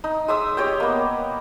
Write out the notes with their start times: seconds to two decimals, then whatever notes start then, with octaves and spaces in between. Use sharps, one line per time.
0.04 D#4
0.28 G#3 E5 D#6 E6
0.57 G4 C#5 D#5 G5
0.80 A#3 B3